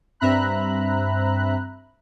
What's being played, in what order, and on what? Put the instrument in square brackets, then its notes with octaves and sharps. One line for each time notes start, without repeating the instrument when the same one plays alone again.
[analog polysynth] G2 C4 E5 A#5 B5 F#6